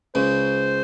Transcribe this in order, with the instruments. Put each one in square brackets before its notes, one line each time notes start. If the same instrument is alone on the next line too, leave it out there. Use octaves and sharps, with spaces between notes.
[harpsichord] C#2 C#3 [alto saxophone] C5